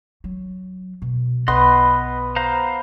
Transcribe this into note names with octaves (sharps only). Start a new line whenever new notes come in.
F#3
B2
B1 B3 B4 D#5 C6
C5 F5 A#5